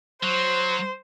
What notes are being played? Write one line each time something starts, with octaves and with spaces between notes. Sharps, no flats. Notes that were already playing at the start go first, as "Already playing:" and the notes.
F#3 C5